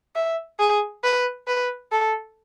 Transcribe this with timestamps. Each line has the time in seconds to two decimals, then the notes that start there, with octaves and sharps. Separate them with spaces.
0.15 E5
0.59 G#4
1.04 B4
1.47 B4
1.92 A4